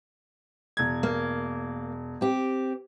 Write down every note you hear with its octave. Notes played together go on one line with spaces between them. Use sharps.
E1 G#6
A#3
C4 G4